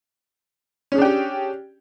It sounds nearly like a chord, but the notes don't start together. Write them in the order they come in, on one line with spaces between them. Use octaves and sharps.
C#4 G#4 D4 G5 G4